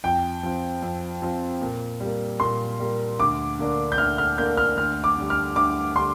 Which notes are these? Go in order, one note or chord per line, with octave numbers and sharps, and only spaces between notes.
F2 G5
F3 C4
F2
F3 C4
A#2
G3
A#3
A#2 C6
G3 A#3
D2 D6
D3 A#3 D4
G6
D2 F6
F6
D3 A#3 D4 G6
F6
D2 F6
D6
D3 G3
F6
D2 D6
D3 G3 C6